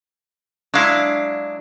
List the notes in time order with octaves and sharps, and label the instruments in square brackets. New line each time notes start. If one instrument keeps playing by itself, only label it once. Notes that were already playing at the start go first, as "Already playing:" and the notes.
[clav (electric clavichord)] F#3 G#3 E4 [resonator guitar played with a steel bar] D4 F5